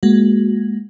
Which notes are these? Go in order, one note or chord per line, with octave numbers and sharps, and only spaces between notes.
G#3 A#3 F#4